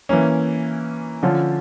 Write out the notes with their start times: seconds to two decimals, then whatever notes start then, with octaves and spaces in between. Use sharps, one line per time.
0.09 E3 A#3 C#4
1.23 D3 F3 C#4 F4